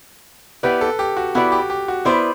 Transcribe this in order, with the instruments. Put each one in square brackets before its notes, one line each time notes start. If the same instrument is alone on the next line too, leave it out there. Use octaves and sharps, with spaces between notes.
[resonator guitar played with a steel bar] B3 E4 G4 D5 [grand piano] B4
[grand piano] A4
G4
F#4
[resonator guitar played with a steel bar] B3 E4 B4 D5 [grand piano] F#4
[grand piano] G4
G4
F#4
[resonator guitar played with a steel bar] B3 E4 B4 D5 [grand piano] C5